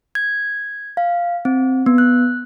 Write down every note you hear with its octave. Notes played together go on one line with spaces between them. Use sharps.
G#6
F5
C4
B3
F#6